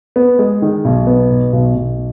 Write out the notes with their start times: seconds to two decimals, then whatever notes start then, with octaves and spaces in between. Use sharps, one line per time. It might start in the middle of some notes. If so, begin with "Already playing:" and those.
0.16 B3
0.39 G#3
0.62 D#3
0.85 B1
1.07 B3
1.30 B2
1.53 B1
1.76 B1